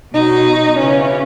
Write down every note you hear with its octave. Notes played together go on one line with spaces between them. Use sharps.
B2 F#3 D#4
C#3 E3 C#4